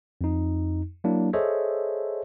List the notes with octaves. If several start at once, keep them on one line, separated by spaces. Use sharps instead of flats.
F2 D#4
F#3 A#3 D4 E4
G#4 A4 C5 C#5 D#5 E5